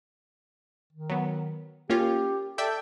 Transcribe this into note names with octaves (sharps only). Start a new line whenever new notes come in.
D#3
F#3 B3
A#3 C#4 F4 G4
A4 D5 E5 G5